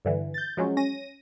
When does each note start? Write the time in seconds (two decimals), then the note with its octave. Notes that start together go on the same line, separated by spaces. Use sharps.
0.05 G2 D3 E3
0.34 G6 A6
0.57 F3 F#3 G#3 C#4
0.77 C#4 A#6 D#7